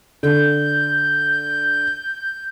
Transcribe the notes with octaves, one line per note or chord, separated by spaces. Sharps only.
D3 G6